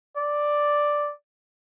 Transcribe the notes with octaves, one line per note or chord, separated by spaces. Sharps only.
D5